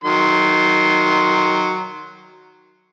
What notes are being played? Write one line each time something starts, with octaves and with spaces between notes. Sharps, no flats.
D#3 F#3 C6